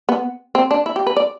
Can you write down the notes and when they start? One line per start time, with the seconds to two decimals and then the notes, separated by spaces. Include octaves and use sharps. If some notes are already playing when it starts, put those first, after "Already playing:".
0.09 B3
0.55 C4
0.71 D4
0.86 E4
0.96 G4
1.07 B4
1.17 D5